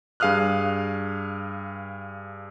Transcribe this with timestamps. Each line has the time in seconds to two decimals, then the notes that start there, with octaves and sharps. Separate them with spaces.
0.20 G2 G#4 F5 D#6 F6 F#6